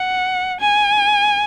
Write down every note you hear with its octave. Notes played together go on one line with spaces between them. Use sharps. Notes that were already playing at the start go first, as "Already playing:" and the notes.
Already playing: F#5
G#5